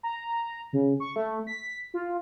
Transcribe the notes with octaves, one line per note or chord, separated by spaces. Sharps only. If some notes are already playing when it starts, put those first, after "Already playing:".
A#5
C#3
C#6
A3
B6
F4